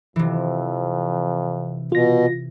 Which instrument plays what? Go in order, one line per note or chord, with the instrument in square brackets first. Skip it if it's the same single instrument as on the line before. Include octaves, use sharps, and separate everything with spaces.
[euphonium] F2 [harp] C3 E3
[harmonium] B2 [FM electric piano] F4 A#6